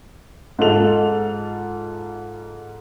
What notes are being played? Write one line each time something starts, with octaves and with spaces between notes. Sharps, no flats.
G#2 G#3 F4 A4 F7